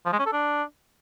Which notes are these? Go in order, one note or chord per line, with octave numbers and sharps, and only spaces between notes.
F3
G#3
C#4
A4
D4